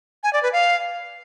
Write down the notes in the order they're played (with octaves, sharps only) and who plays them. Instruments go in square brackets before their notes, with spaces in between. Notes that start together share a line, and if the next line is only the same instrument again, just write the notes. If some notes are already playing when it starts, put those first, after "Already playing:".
[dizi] G#5
D5
B4
F5